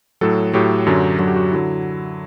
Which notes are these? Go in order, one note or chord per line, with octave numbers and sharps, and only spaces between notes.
A2 F#3 A4
A2 F#3 G4
F#2 D3 F#3
F#2 D3 F#3 F#4
G4
F#4
D3 F#3 E4